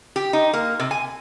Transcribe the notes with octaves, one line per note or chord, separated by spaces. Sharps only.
G4
D#4
A#3
C3
G#5